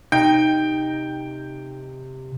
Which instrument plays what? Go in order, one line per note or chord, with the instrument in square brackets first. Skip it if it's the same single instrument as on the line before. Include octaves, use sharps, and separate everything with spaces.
[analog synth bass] C3 [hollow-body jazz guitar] D#4 [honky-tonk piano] G5